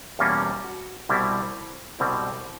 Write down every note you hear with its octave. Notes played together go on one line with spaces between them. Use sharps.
E2 B2 G3 A#3 C#4 F4
F#4
C2 B2 G3 C4 E4
C2 B2 G3 C4 E4